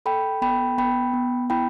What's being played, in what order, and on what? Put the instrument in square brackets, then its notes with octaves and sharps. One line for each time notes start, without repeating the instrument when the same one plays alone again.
[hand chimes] A4 G5 B5
B3 G5 B5
B3 G5 B5
B3
E4 G5 B5